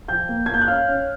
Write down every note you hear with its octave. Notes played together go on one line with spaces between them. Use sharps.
F3 G5 G6
A#3
A#3 G#6
G6
F#6
C#4 F5 F6
C#4